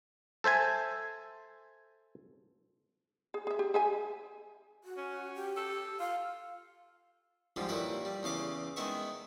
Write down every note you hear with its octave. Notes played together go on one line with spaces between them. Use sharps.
A4 C5 E5 G#5
G#4
G#4 E5
G4
G#4 E5 G#5
F#4
C#4
G4
A4
F4 F5
G#2 D3 F3 G3
D#2 A#2 E4 B4
G3
E2 C#3 F5 D6
D#3 G#3 B3 E5 C#6